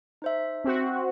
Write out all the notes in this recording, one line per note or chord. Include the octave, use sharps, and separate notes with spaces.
D#4 C5 E5
C4 F#4